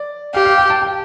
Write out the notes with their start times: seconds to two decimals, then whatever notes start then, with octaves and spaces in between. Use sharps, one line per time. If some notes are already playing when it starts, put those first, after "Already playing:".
Already playing: D5
0.34 G4 F5
0.45 F5
0.58 G5
0.70 A5
0.82 G5